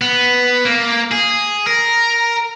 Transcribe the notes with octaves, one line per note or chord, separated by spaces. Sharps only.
B3
A#3
G#4
A#4